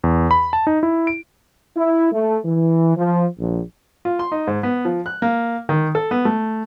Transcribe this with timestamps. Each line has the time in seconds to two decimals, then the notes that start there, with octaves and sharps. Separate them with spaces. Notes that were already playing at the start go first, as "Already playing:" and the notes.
0.04 E2
0.31 B5
0.53 A5
0.67 D#4
0.83 E4
1.07 D7
1.77 E4
2.12 A3
2.45 E3
2.97 F3
3.39 A#1
4.05 F4
4.19 C6
4.32 D#4
4.47 G#2
4.63 B3
4.85 F3
5.06 F#6
5.22 A#3
5.69 D#3
5.95 A4
6.11 B3
6.25 A3